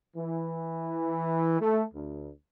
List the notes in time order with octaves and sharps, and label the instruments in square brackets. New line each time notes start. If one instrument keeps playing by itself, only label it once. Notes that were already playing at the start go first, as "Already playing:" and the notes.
[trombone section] E3
A3
D2